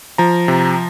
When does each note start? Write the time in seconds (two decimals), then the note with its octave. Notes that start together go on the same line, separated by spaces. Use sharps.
0.18 F3 A#5
0.48 C3